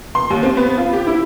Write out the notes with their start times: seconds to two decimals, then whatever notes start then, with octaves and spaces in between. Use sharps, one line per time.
0.15 C6
0.30 D#2
0.43 C4
0.57 B3
0.78 F4
0.93 G4
1.07 E4